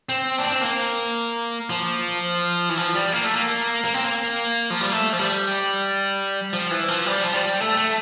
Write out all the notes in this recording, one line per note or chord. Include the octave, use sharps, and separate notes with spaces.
C4
D4
C4
A#3
F3
E3
F3
G3
A#3
A3
A#3
A#3
C4
A#3
F3
G3
A3
F3
G3
F3
E3
F3
G3
F3
G3
A3
A3